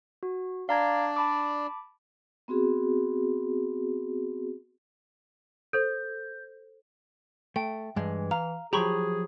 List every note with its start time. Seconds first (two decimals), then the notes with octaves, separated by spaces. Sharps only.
0.23 F#4
0.69 D4 D5 F5 A#5 G#6
1.16 A5 B5 D6
2.48 B3 C4 F#4 G#4
5.73 A4 C5 G6
7.56 A3 G5
7.96 G2 E3 G#3
8.31 F5 A#5
8.73 F3 F#3 G4 G#4 A#5 B5 C#6